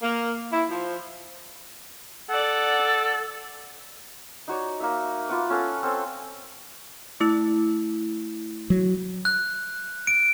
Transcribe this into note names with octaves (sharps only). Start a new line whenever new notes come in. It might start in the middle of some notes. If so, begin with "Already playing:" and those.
A#3
E4
F3
A4 D5 F#5
D#4 F#4 C#5 D5
A#3 D#4 E5
F4 B4 F#5 D6
C#4 A4 F5 F#5
C4 C#4 A4 C5
A3 E4 E6
F#3
F#6
D7